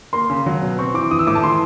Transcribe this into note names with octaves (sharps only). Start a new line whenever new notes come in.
A#3 C6
C#3
F#3
B2
C4 C#6
E3 D6
E3 D#6
E6
A2 D6
A5
E3 C6